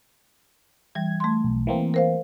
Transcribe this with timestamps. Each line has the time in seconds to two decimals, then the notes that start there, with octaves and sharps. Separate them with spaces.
0.95 E3 G3 G#6
1.20 A3 C6
1.44 B1
1.67 E3 A#3 C4
1.94 A#4 C5 F5